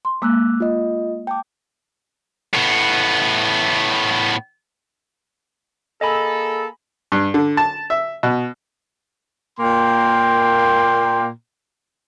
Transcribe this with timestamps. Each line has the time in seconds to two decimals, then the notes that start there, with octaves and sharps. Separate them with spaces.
0.05 C6
0.22 G#3 A#3 D6 E6 F#6
0.60 F4 D#5
1.27 G5 A5 D6
2.53 A2 B3
6.01 A#3 G#4 A4 D#5 G#5 B5
7.12 G2
7.34 D3
7.57 A5
7.90 E5
8.23 B2
9.60 A#2 A#3 G5 C6